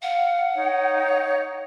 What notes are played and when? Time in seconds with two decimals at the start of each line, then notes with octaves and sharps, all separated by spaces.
0.02 F5 F#5
0.54 D#4 C#5